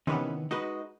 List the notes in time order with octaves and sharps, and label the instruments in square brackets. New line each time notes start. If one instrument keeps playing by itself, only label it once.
[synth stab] C3 E3 B3 [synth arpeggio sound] D#3 [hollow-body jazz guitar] C#4 D#4 B4
[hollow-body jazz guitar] G#3 F#4 B4 [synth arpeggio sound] D#4 [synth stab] D#5